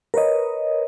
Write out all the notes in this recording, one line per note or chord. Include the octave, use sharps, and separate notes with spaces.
A#4 B4 C#5 D#5